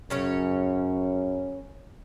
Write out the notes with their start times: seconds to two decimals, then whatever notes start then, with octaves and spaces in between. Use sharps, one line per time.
0.10 F#2 C#3 C#4 C#5